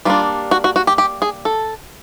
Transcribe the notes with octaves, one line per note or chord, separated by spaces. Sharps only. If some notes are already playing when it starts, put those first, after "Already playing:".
G3 A#3 D4 F4
F#4
F#4
F#4
G4
G4
G#4
A4